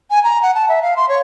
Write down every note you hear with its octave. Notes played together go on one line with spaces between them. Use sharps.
G#5
A#5
F#5
A5
E5
F5
C6
C#5